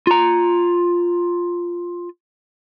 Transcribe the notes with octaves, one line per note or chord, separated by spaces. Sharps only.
F4 A#5